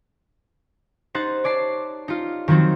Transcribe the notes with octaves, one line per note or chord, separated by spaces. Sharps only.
D#4 C5 F#5 A6
C#5 D5 A5 C7
D#4 F4
D#3 F3 F#3 C4 D#4